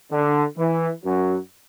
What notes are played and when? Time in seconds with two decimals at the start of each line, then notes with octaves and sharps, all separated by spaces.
0.11 D3
0.57 E3
1.03 F#2 F#3